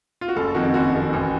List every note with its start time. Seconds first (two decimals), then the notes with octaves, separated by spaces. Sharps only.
0.21 F4
0.28 F#4
0.36 F#1 A4
0.54 F2 D#3 F#4
0.74 F#1 F#4
0.94 F2 D#3
1.13 A1